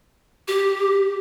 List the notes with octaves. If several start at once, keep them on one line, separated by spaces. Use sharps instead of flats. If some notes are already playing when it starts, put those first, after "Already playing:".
G4